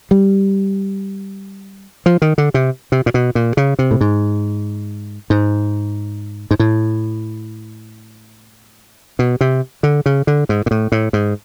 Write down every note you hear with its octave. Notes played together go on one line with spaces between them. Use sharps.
G3
F3
D#3
D3
C3
C3
A#2
B2
A#2
C#3
C3
A2
G#2
G#2
G#2
A2
B2
C3
D3
C#3
D3
G#2
A#2
A2
A2
G#2